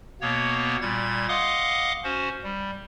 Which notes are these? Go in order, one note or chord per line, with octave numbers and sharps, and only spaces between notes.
B2 A#3 B3 C#5
A#2 G3 G#6 A6
D#5 F5 F#5 C6 D6 D#6
C#4 F#4 C5
G3